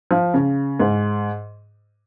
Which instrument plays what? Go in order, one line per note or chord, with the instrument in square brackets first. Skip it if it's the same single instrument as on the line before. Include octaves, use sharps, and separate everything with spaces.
[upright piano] F3
C#3
G#2